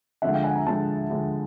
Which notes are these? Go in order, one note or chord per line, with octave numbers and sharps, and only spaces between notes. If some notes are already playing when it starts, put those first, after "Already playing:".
D3 F3 G#3 E5 F#5
F5 G5
F#5 G#5
G#5 A#5
D3 F3 G#3 G5 A5
D3 F3 G#3